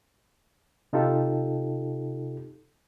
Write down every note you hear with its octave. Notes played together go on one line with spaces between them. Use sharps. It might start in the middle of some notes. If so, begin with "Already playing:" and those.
C3 D#4 F4 G4 A4